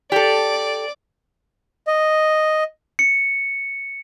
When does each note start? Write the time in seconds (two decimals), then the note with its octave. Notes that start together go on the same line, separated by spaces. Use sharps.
0.12 G4 A4 D5
1.87 D#5
2.99 C#7